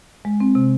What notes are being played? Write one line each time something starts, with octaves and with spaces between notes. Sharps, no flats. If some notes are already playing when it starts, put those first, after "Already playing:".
G#3
C4
C3